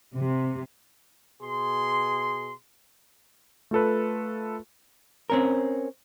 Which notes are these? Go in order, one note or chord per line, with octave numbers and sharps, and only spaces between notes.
C3
B2 G#4 C6
A3 F4 A4 B4
C4 C#4 A#4